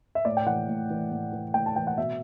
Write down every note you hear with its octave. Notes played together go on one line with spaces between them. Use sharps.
E5
A2 D5
G5
E3 F#5
A2
E3
A2
E3
A2 G5
A5
E3 G5
F#5
B2 E5